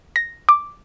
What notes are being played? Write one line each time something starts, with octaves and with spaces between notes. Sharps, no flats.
A#6
D6